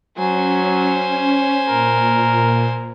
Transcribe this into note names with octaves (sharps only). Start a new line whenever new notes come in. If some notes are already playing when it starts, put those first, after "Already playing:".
F#3 C#4 C5 G#5
A#2 A#4